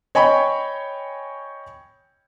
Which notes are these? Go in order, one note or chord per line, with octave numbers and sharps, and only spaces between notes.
C#5 D#5 G5 G#5 B5 C#6